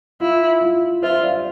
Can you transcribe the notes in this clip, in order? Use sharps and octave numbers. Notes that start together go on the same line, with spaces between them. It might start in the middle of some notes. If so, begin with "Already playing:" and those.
E4 F4
F4
F4 C5 E5
D5 F5